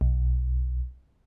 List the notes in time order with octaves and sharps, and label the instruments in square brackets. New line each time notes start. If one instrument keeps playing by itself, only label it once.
[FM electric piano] B1